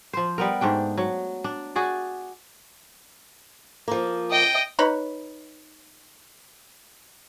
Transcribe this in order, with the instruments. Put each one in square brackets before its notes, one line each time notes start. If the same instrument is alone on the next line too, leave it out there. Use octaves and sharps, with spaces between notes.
[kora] F3 C5
G3 B3 A#4
G#2 A3 D4 G5
F#3
D4
F#4 G#4 D5
[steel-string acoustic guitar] F3 A#3
[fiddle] D#5 G5
[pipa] D#4 B4 C#5